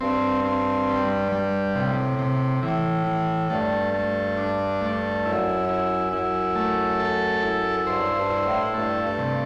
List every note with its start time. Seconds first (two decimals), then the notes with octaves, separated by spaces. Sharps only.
0.01 G2 C4
0.45 C4
0.89 G3
1.32 G3
1.75 A2 C3
2.19 C3
2.63 A2 E3
3.07 E3
3.50 G2 A3
3.94 A3
4.37 D4
4.81 A3
5.25 F#2 E4
5.69 E4
6.13 F#2 E4
6.56 A3
7.00 A4
7.43 E4
7.87 G2 C5
8.16 G2
8.30 E4
8.45 A2
8.74 G2 A3
9.04 G2
9.18 C3